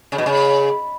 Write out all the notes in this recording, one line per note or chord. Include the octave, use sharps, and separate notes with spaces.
C#3
B2
C#3